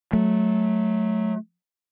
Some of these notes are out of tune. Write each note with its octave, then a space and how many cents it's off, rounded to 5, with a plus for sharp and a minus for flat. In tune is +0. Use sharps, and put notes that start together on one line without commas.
F#3 +0 A3 -15